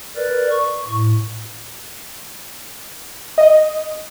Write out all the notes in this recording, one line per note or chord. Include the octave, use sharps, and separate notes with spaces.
A#4 B4 D5
C#6
A2
D#5